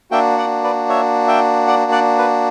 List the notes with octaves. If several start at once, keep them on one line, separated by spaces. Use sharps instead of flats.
A#3 D4 F#4 E5 G5
D5 F#5
B4 D5
C#5 E5
E5 G5
D5 F#5
D5 F#5
B4